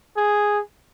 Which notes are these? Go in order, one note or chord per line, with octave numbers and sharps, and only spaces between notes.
G#4